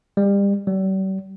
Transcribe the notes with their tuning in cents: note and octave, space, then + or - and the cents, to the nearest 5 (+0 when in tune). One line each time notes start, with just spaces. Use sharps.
G3 +30
G3 -45